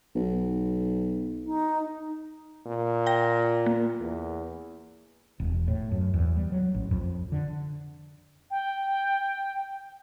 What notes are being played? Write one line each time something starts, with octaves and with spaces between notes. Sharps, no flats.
B1
D#4
A#2
G5 A#6
A#3
E2
E1
A2
F#2
E2
G3
F#3
A1
F2
D3
G5